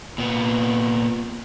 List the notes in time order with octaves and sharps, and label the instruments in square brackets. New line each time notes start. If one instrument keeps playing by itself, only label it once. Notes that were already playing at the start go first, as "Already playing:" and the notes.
[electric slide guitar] A#2 B3